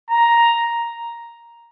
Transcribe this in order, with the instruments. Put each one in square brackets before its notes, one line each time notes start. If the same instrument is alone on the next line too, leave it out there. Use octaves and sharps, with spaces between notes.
[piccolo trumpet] A#5